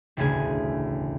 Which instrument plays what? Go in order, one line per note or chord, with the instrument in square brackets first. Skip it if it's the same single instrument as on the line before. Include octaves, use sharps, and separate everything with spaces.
[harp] E1 A1 D2 C#3 G#4 G#5